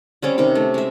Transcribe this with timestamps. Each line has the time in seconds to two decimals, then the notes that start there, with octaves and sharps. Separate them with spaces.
0.22 G3 C4 C#4 D6
0.38 C3 D#3 C#4 G4
0.55 A3
0.74 G#3 E5